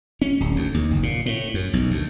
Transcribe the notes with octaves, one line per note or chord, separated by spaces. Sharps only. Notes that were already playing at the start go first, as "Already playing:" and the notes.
C#4
D1
D2
D#2
F#1
A#2
A2
F#2
B1
D2